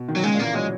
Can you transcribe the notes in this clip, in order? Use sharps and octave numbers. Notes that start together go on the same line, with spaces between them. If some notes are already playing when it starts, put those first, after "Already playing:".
Already playing: B2
D#3
F#3
C#3 G#3
A#2
E3 A#3
F#3 G#3